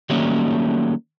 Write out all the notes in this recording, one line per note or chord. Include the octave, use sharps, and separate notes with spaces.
D#3 F#3 G3 A3 A#3 C#4